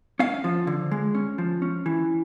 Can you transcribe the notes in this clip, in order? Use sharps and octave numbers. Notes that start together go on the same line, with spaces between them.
C#4 F5
F3
D3
G#3
C#4
F3
C#4
E3